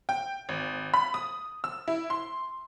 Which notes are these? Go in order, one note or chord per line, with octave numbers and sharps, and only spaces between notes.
G5
G#1
B5
D#6
E6
E4
C6